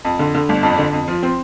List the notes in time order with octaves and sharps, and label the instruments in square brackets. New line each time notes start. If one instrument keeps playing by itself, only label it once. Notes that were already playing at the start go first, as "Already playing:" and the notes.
[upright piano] F2
D3
D3
G1
F2
D3
F2
F3
C4